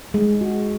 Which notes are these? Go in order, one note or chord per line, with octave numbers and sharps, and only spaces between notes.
G#3
F#4